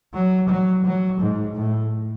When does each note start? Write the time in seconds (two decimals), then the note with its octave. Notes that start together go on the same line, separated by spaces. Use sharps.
0.14 F#3
0.49 F#3
0.85 F#3
1.20 G#2
1.55 A2